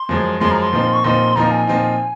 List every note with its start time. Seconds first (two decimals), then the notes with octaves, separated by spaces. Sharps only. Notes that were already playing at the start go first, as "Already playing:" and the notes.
Already playing: C6
0.09 F#2 F3 G#3
0.40 F#2 F3 G#3 C6
0.51 A#5
0.62 C6
0.72 A#2 F3 C4 D#4
0.93 C#6
1.04 A#2 F3 C4 D#4 C6
1.36 A#2 F3 C4 D#4 A#5
1.51 G#5
1.67 A#2 F3 C4 D#4